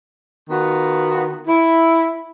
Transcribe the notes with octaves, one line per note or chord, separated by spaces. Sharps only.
D#3 B3 F4 F#4
E4